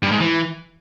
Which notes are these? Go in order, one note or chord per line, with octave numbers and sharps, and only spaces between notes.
G2
G#2
E3